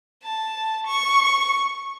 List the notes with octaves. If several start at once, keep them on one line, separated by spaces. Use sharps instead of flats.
A5
C#6